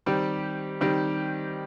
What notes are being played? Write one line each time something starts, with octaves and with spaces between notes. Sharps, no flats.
D#3 G3 C4 G4
D#3 G3 C4 G4